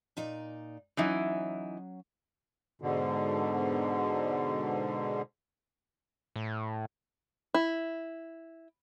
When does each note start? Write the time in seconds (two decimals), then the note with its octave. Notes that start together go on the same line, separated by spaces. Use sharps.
0.17 A#2 D#4 D5
0.97 E3 F#3 C#4 D#4 E4
2.81 G#2 B2 D3
6.36 A2
7.54 E4